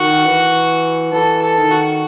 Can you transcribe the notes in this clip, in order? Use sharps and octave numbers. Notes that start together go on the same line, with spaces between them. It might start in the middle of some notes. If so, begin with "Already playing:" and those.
Already playing: D#3 F#4
E3
E3 A4
A4
D#3
F#4